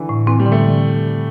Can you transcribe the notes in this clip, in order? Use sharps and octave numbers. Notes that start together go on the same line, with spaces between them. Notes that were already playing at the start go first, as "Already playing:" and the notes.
Already playing: D3 E3
A2
E3 C4
G3
D3
A3